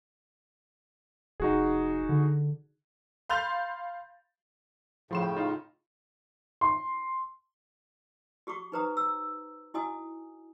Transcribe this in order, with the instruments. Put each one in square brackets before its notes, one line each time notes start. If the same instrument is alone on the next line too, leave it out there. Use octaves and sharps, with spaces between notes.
[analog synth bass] F1 [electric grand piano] D#4 F#4 G#4
[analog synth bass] D3
[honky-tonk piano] F5 B5 C6 G6 A6 F7
[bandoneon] A2 C#3 [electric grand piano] F3 C6 E7
[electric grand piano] G5
D#4 F4
[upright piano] C6
[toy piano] F#4 G4 C#6 D6
D#4 G4 B4 C5 A#5 D#6
E6
E4 F#4 D#5 G#5 D#6